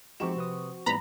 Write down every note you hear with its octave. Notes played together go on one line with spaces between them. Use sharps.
F3 G#3 C4 D#4 F#4 G4 C#6 E7
C3 B4 D#6
G#2 E3 G3 A#3 B3 A#5 B5 A#6